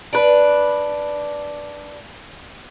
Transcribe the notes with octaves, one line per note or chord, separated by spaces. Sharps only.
D4 B4